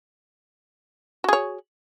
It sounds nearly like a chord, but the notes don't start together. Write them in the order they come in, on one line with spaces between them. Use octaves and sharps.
F#4 G#4 C#5